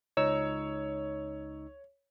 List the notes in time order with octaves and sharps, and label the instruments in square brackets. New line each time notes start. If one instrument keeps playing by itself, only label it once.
[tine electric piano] C#2 D#4 E6 [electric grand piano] C#5